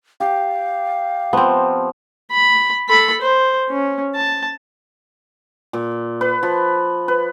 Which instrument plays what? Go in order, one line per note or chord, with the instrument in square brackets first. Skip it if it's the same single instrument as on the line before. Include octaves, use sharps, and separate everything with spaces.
[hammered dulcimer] G4 [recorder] F5
[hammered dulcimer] F3 [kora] B3 C4
[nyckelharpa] B5
A4 B5
C5
C#4
A5
[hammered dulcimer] A#2
B4
F3
B4